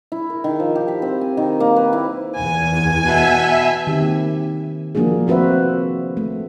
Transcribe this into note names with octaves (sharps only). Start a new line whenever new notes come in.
E4
A#4
D#3
F3
G4
B5
C4
G#5
D#3
A#3
B4
E4
E2 G#5
B2 E5
D#3 C4 G4
A#3
F3 A#3 D4 F#4 G#4
A3 C4 F#4 B4 C5 E5
A3